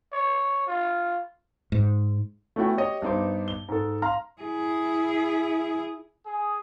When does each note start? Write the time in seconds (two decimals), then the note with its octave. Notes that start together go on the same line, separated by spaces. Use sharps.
0.13 C#5
0.67 F4
1.72 G#2
2.56 A3 B3 C#4 E4 F#4 G5
2.77 G4 C#5 D#5
3.02 G2 B3 D#4 C5 D6
3.48 G7
3.69 G#2 A4
4.02 F5 A#5 C6 F6
4.41 E4 G#4
6.27 G#4